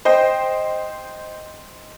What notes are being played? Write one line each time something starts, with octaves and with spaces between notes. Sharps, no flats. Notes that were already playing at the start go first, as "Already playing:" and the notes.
C5 D#5 G5